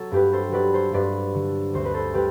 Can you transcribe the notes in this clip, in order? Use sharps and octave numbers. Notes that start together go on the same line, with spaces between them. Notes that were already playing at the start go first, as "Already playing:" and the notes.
Already playing: F#3 A4
G2 G4 B4
A4 C5
F#3 B4 D5
A4 C5
G2 B4 D5
D3
D2 C5
B4
A4 C5
G3 G4 B4